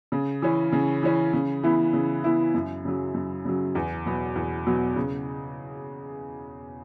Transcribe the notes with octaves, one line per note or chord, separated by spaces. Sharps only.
C#3
E3 C#4
C#3
E3 C#4
C#3
E3 B3 E4
C#3
E3 B3 E4
F#2
C#3 F#3
F#2
C#3 F#3
E2
B2 F#3 B3
E2
B2 F#3 B3
C#3